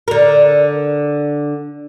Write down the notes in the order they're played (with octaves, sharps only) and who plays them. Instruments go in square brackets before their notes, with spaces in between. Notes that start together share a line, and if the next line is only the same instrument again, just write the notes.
[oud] D3 A#4